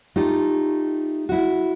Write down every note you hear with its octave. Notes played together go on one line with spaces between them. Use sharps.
A3 D#4 F4 G4
E4 F#4